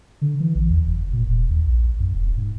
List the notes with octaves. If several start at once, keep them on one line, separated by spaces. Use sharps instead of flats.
D3
E3
A1
E2
F#1
A#2
D#1
D#2
A#1
F#2
E1
G#2